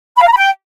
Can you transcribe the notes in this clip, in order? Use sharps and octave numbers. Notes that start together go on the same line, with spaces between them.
B5
F5
A#5
B5
G5